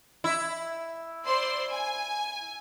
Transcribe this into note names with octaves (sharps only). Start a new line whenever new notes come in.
E4
C5 D5 C6
G#5